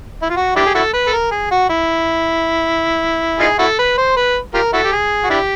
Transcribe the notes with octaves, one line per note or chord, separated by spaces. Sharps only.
E4
F4
F#4
D4 E4 G4
G#4
E4 F#4 A4
B4
A4
A#4
G#4
F#4
E4
D#4 F4 G#4
E4 F#4 A4
B4
C5
B4
F4 G4 A#4
E4 F#4 A4
G4
G#4
F#4
D4 E4 G4